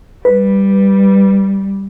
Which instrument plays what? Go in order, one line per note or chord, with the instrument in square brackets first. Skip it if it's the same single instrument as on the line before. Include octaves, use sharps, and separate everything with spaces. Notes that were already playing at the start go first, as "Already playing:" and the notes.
[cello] G3 [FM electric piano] B4